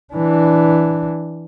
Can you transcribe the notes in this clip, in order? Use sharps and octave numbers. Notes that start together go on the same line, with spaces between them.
E3 D4